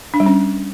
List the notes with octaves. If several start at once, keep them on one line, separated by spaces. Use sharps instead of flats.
D4
G3
C#4